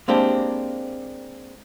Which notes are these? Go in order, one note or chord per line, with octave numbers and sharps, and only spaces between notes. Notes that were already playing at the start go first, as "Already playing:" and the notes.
G#3 A#3 C4 D4 G4